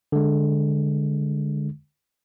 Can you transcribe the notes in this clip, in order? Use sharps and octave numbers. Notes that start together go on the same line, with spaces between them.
D3 G#3